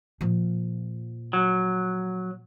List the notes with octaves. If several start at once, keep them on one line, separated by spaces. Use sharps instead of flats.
A#2 F3
F#3